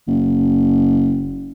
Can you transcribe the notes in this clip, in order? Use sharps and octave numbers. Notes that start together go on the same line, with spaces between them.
F#1